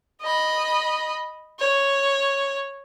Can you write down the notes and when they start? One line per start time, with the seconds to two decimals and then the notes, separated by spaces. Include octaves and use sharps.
0.22 D#5 B5
1.60 C#5